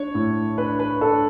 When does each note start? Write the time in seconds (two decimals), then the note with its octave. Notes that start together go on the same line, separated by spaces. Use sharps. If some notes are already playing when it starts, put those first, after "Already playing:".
Already playing: D4 C#5
0.15 A2
0.58 D4 B4
0.79 B4
1.01 D4 A4